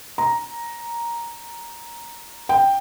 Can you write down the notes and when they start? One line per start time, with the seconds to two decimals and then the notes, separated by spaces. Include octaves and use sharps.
0.18 A#5
2.49 G5